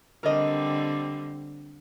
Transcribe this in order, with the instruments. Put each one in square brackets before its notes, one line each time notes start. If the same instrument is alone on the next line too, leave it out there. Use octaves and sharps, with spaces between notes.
[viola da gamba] D3 G3 C4 [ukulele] A#4 D#5